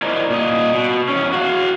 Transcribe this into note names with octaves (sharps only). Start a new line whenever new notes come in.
E4 A#4 C5 D5 D#5
A#2 D#5
B2
E2 C#4
F#4 F5